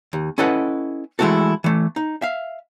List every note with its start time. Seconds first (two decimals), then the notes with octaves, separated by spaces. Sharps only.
0.13 D#2
0.38 C#4 E4 A4 B4 D#5 F#5
1.19 E3 G#3 A3 E4 F#4 A4
1.64 E3 A3
1.96 D#4
2.22 E5 F5